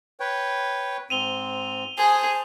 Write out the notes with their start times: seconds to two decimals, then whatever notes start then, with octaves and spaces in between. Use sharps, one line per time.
0.20 B4 C#5 G5
1.10 G#2 C4 D#7 F7 G7
1.98 G#4 C5 G#5 A5